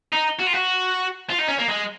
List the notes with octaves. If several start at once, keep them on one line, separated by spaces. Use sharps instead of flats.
D#4
F#4
F4
F#4
F4
D#4
C#4
A#3
G#3